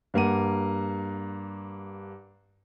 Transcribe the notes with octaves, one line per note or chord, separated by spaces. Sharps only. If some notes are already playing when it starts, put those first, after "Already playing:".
G2 A#3 F#5 D#7